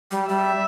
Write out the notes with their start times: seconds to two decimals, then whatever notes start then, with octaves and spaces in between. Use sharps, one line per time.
0.11 G3
0.29 G3 E5